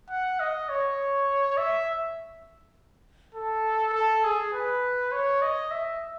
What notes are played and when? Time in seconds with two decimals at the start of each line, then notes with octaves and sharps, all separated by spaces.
0.10 F#5
0.40 D#5
0.69 C#5
1.57 E5
3.35 A4
3.94 A4
4.24 G#4
4.53 B4
5.12 C#5
5.42 D#5
5.71 E5